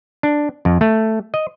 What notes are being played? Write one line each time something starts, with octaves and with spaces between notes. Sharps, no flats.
D4
F2
A3
D#5